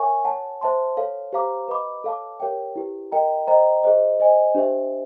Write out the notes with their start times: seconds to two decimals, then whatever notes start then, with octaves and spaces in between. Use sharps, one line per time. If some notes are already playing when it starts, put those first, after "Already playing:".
Already playing: A#4 C#5 E5 G#5 C#6
0.25 C#5 F#5 A5
0.61 C5 E5 A5 C6
0.97 A4 C#5 F5
1.33 G4 C5 F5 A#5 D6
1.68 B4 D#5 F#5 B5 D6
2.04 A4 C#5 F5 A5 D6
2.40 G4 A#4 C#5 E5 G5
2.76 E4 G4 B4
3.12 A#4 D#5 G5 A#5
3.47 C5 D#5 G5 A#5
3.84 G#4 C5 D#5
4.20 C5 D#5 G#5
4.55 D4 G4 C5 E5